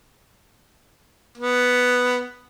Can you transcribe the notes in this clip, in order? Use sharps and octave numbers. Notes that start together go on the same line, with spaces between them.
B3